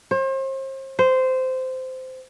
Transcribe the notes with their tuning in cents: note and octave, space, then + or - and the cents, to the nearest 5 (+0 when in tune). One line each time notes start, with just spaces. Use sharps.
C5 +40
C5 -15